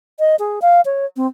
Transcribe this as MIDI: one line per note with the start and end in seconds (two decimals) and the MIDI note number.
0.19 0.36 75
0.39 0.60 68
0.62 0.81 77
0.85 1.06 73
1.16 1.27 60